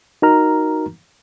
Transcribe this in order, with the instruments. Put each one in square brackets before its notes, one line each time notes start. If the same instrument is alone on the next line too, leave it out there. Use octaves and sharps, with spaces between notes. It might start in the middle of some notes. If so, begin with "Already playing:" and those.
[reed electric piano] D#4 F#4 A#4 A#5 F6